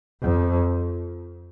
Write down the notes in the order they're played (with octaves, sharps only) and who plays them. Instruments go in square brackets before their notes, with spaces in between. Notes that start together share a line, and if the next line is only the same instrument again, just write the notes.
[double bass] F2